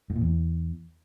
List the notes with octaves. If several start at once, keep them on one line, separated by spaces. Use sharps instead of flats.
G#2
A#2
E2